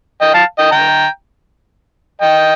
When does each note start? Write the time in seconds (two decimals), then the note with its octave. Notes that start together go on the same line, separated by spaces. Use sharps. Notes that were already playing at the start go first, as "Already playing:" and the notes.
0.21 D#5 G5
0.34 F5 A5
0.58 D#5 G5
0.71 G5 A#5
2.21 D#5 G5